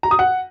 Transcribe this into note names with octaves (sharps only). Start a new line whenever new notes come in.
A#5
D#6
F#5